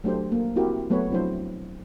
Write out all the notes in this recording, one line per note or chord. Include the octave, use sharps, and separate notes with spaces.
F#3 A3 D4 G4 C5
A#3
C4 E4 F#4 G4 A#4
F#3 A3 B3 B4 C#5
F3 F#3 C4 D4 E4 C5